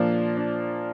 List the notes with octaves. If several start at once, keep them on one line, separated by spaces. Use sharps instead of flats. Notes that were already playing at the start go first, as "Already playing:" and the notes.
Already playing: A#2 F3 A#3 D4
D4